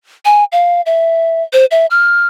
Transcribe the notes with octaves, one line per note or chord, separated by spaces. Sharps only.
G#5
F5
E5
C5
E5
F6